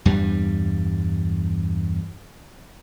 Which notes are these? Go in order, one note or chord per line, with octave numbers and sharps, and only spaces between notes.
E2 G2 G3